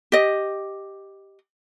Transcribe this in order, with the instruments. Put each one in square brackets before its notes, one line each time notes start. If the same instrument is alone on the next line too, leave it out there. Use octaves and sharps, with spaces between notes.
[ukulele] G4 D#5